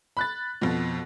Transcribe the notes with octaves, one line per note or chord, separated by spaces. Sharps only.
B5 F#6 A6
F2 B2